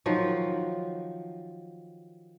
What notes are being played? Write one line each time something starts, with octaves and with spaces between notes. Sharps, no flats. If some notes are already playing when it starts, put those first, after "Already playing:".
D#3 F3 F#3